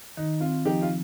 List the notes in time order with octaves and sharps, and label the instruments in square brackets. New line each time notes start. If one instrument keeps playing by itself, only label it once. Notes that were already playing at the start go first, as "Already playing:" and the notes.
[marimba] D#3 [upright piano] D#4
[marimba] C4 [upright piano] F4
[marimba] F3 [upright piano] D#4 G4
[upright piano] F4